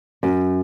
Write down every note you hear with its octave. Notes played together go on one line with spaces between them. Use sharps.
F#2